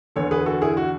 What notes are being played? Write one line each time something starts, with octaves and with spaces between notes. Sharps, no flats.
E2 D3 A4 C#5
G#4 B4
F#4 A4
E4 G#4
F#4